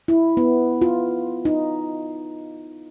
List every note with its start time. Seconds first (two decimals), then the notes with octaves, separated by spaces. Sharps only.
0.08 E4
0.37 B3
0.81 F4
1.45 D#4